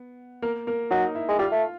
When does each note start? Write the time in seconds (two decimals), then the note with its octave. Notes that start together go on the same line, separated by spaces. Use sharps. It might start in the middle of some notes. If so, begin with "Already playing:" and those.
Already playing: B3
0.42 A#3 A#4
0.67 A#3 A#4
0.91 F#3 D#4 D#5
1.15 E4 E5
1.28 G#3
1.39 G3 F4 F5
1.52 A3